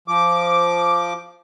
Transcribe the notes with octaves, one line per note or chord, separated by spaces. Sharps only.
F3 D6